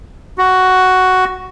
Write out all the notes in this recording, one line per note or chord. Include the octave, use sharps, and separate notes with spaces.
F#4